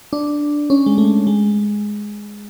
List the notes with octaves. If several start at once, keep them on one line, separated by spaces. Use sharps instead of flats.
D4
C#4
G#3
A3
G#3